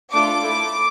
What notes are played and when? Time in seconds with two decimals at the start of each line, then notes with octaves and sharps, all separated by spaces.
0.13 A3 D4 F4 A4 D6
0.41 A3 E4 A4